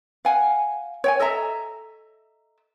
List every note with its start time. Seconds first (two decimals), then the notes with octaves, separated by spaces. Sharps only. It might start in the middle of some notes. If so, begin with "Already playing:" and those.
0.25 F5 F#5 G#5
1.04 C#5 G5 G#5
1.19 A4 D#5 E5 A#5